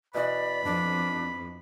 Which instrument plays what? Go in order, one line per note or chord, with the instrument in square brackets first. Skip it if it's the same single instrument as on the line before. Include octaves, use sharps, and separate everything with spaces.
[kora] B2 E3 F#4 [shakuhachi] D5 [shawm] B5
[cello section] F2 [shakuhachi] D4